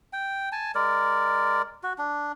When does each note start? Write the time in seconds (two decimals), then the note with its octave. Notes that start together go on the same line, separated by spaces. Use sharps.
0.13 G5
0.52 G#5 A5
0.75 G#3 A#4 D5
1.83 F#4
1.98 D4